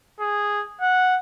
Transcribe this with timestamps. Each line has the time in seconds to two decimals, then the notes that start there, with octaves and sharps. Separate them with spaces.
0.20 G#4
0.81 F#5